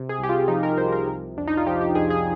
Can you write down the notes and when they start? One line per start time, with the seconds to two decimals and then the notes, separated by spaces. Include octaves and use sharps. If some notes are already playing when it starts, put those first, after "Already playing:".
Already playing: C3
0.09 G#4
0.19 C2 G4
0.29 F4
0.48 F3 D#4
0.63 A#4
0.78 C2 C5
0.92 A#4
1.08 C3
1.37 F2 D4
1.48 D#4
1.57 F4
1.66 F3 G4
1.81 G4
1.95 F2 G#4
2.10 G#4